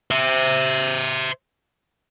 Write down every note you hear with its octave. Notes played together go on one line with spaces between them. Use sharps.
C5 E5